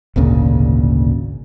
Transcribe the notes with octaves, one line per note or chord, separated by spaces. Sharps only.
G#1 D2 A#2 C#3